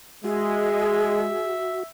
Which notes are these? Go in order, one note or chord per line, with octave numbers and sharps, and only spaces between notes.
G#3 F#4 G#4 E5